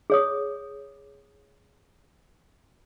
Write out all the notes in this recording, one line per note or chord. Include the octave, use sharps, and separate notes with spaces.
G#4 C#5 D#6